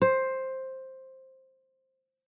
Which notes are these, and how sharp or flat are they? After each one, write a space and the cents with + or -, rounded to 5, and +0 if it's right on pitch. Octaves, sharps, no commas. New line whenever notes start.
C5 +10